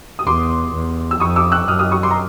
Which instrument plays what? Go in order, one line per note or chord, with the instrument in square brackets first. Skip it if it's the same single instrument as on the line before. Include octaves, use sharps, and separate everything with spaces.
[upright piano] D#6
[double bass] E2 [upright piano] C6 D6
[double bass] E2
[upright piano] E6
[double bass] F2 [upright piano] C#6 D#6
[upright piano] D6 E6
E6 F#6
[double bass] F#2 [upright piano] D#6 F6
[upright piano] D#6 F6
C#6 D#6
C6 D6
A#5